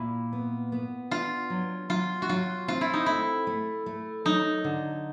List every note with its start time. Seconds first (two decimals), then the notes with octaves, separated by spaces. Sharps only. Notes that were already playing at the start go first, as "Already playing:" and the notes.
Already playing: A#2 E4
0.33 B3
0.72 B3
1.11 D4 F4
1.50 F#3
1.89 F#3 F4
2.22 F#4
2.29 F#3 F4
2.68 C4 F4
2.81 E4
2.94 D#4
3.06 A3 E4
3.47 A3
3.86 A3
4.25 F#3 D#4
4.64 D3